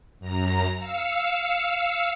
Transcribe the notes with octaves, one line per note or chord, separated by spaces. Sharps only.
F#2 A#5
F5 E6 C#7